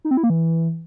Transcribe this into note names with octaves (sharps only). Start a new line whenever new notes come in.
D#4
C4
E4
A#3
E3